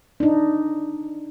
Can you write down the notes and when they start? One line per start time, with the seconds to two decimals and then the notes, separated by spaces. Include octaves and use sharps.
0.20 D4 D#4